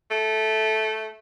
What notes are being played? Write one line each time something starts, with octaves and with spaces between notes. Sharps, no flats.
A3